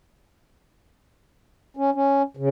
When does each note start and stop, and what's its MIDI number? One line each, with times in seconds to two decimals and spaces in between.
1.77 1.90 61
1.95 2.22 61
2.37 2.49 49